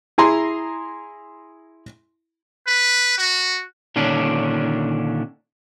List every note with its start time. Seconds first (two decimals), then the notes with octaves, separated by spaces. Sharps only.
0.18 E4 G#4 G#5 A#5 C6
2.67 B4
3.18 F#4
3.96 A#2 D3 D#3 C#4 D4